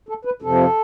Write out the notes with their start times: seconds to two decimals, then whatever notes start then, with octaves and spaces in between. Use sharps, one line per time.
0.09 A4
0.25 B4
0.42 F2 C3 F3 A4